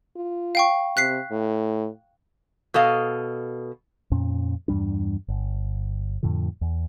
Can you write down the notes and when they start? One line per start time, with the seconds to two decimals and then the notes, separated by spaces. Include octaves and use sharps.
0.16 F4
0.55 F5 G5 C#6
0.97 C3 F#6 B6 C7
1.31 A2
2.74 B2 A4 D#5 F5
4.12 F2 A#2 C#4
4.68 E2 G2 G3 D4
5.28 G1
6.23 F2 A2 D3 F3
6.61 E2